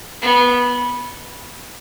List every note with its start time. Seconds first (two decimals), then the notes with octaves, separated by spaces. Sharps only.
0.22 B3